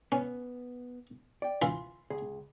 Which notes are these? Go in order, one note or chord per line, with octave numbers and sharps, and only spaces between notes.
B3 C#4
D5 G5
E3 E4 F4 C6
C#2 G#4